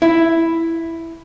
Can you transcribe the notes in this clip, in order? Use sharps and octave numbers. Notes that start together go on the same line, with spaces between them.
E4